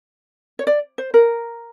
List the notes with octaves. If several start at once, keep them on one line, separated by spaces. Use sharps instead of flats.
C#5
D5
C5
A#4